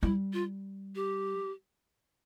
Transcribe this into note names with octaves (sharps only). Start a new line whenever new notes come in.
G3 E4
F4
G4